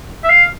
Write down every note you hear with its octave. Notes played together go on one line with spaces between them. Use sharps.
E5
F5